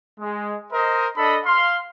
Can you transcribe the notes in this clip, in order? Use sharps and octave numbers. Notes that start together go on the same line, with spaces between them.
G#3
A#4 C5 D#5
D4 A4 D#5 B5
F5 C6